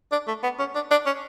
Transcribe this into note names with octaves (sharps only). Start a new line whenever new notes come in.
D4
A3
B3
C#4
D4
D4
C#4